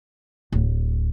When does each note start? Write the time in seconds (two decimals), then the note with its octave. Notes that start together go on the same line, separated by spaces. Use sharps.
0.52 D1